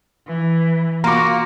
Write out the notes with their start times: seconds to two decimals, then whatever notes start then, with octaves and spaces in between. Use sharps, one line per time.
0.27 E3 B4
1.04 A#3 F4 F#4 A#5 C6 D6 A#6